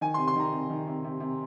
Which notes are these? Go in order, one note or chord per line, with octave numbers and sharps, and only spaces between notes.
D#3 G#5
C3 C6
C6
D#3 A#5
C3
D#3
C3
C3
C3